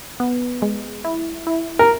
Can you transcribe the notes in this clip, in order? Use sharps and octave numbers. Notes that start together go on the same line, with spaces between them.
B3
G#3
E4
E4
A#4